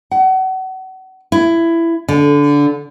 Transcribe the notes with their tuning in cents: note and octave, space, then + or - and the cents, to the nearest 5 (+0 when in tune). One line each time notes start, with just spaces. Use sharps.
F#5 +30
E4 +15
D3 -20